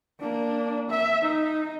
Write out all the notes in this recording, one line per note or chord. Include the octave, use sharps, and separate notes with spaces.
A#3 D4
E5
D#4